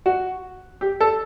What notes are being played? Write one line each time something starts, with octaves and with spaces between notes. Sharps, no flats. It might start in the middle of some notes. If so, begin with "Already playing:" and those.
F#4
G4
A4